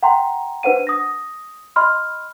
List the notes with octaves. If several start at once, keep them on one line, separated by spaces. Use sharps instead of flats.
F#5 G5 A#5 C6
D4 B4 C5 F#5 D#7
D#6 A#6
D#5 B5 C6 F6